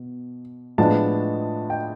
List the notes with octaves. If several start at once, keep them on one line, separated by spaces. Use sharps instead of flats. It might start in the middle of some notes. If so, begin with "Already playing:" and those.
Already playing: B2
A2 F3 G#3 B3 D4 A5
G5